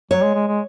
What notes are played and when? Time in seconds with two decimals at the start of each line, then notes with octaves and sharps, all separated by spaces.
0.11 F#3 C#5
0.23 G#3
0.35 G#3
0.48 G#3